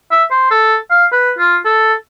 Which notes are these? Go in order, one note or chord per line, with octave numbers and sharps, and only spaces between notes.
E5
C5
A4
F5
B4
F4
A4